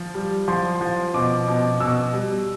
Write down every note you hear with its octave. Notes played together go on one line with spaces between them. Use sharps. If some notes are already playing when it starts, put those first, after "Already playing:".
Already playing: F3
G3
F3 C6
F3
B2 D6
B2
B2 E6
G3